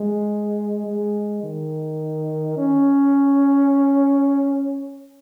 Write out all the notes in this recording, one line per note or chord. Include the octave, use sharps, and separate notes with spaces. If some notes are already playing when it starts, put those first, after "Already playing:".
Already playing: G#3
G#3
D#3
C#4